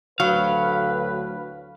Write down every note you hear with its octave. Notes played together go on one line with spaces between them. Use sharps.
D2 A2 F#3 B4 F5